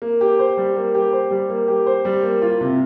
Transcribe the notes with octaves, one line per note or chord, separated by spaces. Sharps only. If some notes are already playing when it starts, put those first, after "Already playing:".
A#3
G4
C5
G3
A#3
G4
C5
G3
A#3
G4
C5
G3
A#3
F4
C3